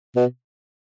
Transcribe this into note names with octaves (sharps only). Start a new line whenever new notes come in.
B2